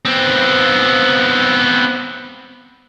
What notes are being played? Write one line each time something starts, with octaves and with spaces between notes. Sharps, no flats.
B3 C4